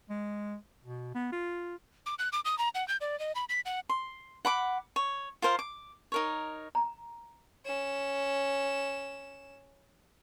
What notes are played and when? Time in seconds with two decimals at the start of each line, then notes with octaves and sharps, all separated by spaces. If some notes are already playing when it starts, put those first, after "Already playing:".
0.10 G#3
0.84 B2
1.14 B3
1.32 F4
2.06 D6
2.19 F#6
2.33 D6
2.45 D#6
2.59 A#5
2.75 F#5
2.88 G6
3.01 D5
3.20 D#5
3.35 B5
3.49 B6
3.66 F#5
3.89 C6
4.45 F#5 B5 D6
4.96 C#5
5.42 F4 A#4 C5 F5
5.59 D6
6.12 D#4 A#4 C#5
6.75 A#5
7.65 C#4 E7